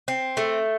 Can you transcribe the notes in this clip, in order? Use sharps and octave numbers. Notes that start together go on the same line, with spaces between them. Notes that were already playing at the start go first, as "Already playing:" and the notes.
C4
A3